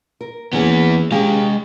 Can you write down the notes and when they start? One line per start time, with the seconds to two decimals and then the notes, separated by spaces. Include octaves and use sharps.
0.21 A#4
0.53 E3 A#3 B3 C#4 G#4
1.12 G#3 C#4 G4 G#4 F5